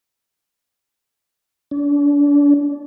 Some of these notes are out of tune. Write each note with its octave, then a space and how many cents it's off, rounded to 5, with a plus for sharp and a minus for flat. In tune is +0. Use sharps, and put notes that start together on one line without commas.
D4 -35